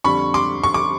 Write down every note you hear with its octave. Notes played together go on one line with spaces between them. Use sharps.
F2 D3 G3 B5 C#6
C6 D6
C#6
D6